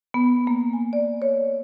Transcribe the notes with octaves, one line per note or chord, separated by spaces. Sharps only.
B3
A#3
G#5
D5
C#5